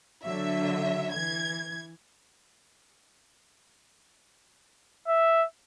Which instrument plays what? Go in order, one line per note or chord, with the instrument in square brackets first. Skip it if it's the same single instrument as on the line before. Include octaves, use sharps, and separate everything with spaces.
[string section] D3 F#3 E5
E3 G#6
[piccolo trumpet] E5